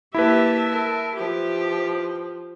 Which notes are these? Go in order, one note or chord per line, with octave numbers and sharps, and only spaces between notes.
A#3 E4 G4 B4 E5 A5
A#4
F3 G4